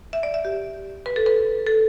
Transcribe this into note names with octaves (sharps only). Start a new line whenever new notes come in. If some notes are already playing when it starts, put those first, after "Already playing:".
E5
D5
E5
G4
B4
A4
B4
A4